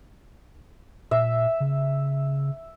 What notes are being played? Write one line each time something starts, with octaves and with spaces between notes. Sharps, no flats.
A#2 E5
C#3